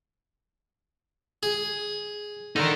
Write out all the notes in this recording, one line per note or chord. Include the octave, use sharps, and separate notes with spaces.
G#4
D3 D#4 A#4